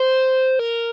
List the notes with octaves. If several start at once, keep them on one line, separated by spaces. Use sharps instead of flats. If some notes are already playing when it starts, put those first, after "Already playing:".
Already playing: C5
A#4